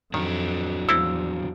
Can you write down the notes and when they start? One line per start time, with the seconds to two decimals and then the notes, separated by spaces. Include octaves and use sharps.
0.14 F2 D#3 F#3 D4
0.89 E2 F3 C4 E4 A4 E6